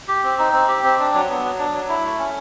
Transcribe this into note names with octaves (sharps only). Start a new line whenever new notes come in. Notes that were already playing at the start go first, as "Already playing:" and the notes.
G4
C4
D#4
C4
G4
C4
D4
F#3
B3
F#3
D4
F#3
E4
A3
C#4